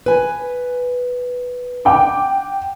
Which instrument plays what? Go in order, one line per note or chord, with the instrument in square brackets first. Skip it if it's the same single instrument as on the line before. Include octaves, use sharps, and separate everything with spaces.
[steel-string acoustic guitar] B4 G#5
[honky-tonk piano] F#5 G5 D6